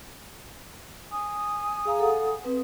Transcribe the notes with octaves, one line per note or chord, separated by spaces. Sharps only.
G#5 D#6
G#4 F5 A#5
A4 F#5
C4 B4